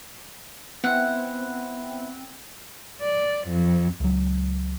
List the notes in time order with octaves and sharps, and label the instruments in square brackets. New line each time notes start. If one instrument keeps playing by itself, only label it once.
[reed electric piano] B3 [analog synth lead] C4 [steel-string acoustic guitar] E4 E5 [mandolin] F#5
[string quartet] D5
F2
[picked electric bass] C#2 F#3